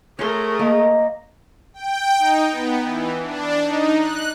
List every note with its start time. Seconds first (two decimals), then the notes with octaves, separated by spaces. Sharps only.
0.19 A3 G#4 A#4 C#5 C6
0.59 A#3 D#5
1.74 G5
2.19 D#4
2.51 B3
2.85 E3
3.22 D4
3.62 D#4
3.98 F#6